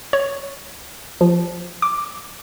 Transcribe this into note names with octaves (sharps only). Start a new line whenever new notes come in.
C#5
F3
D6